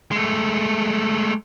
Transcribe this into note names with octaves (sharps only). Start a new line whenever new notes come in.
G#3 A3